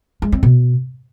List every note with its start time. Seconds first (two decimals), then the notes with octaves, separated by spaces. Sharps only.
0.22 G#3
0.32 C4
0.43 B2